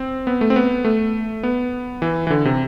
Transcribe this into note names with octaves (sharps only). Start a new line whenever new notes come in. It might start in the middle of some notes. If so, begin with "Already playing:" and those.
Already playing: C4
B3
A3
C4
B3
A3
B3
E3
E3
D3
C3